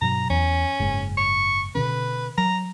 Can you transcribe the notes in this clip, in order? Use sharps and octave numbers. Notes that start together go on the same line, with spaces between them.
G2 B2 F#3 A#5
E2 C#4
F#1 G#2
C#6
B2 D3 C#4 B4
F#3 A#5